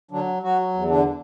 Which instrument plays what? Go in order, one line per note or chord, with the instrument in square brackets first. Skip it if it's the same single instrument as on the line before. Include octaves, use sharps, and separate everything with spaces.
[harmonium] D3 F#3 D4
F#3 F#4
E2
D3 D4